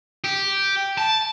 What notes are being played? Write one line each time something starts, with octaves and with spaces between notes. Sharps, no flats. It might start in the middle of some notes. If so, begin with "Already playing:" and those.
G4
A5